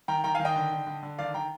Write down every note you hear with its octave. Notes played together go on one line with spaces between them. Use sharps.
D#3 G5 A#5
D#3 G5 A#5
F5 G#5
D#3
D#5 G5
D3
D3
D3
D3
D#3 D5 F5
D#3 G5 A#5